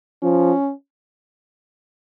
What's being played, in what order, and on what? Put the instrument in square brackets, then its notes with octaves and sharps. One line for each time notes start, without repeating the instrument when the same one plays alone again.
[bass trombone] F3 [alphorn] C#4